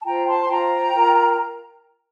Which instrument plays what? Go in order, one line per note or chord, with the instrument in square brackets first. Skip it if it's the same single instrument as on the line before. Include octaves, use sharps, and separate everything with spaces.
[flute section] A5
F4 C5 G5 A#5
A5 C6
C6
F4 C5 G5 A#5
F4 A#4